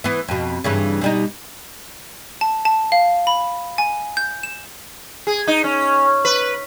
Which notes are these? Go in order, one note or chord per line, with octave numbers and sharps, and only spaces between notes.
E3 B3
F2 B2
G2 C#3 E3
B2 G3 D#4
A5
A5
F5
B5
G#5
G6
E7
G#4
D#4
C#4
B4